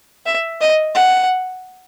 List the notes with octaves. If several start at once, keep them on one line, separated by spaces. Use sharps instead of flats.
E5
D#5
F#5